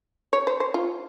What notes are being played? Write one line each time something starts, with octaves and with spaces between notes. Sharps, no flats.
C#5
C5
C5
F4